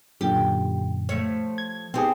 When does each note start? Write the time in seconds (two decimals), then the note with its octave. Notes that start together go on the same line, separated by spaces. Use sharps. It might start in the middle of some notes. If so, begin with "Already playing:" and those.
0.21 F#2 A#2 D3 G4
1.09 F3 A3 C#5
1.58 G#6
1.94 B3 C4 D#4 G4 G#4